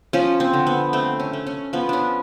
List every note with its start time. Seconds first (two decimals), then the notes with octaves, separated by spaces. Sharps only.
0.13 F3 C#4
0.40 C4
0.53 D3
0.67 B3
0.93 A3 C4
1.20 C#4
1.33 A3
1.47 C#4
1.73 F3 B3
1.89 C#4 D4